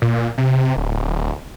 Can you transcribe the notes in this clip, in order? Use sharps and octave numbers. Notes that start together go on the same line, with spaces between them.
A#2
C3
D1